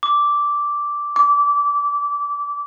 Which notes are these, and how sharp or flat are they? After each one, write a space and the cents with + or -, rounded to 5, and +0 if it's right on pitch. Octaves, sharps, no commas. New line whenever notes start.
D6 -5
D6 -20